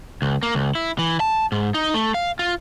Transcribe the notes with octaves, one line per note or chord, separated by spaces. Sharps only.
C#2
A#3
C#2
E4
E3
A5
G#2
D#4
A3
F5
F4